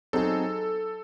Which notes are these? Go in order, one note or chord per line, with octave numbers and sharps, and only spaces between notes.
F#3 C4 D#4 G#4 A4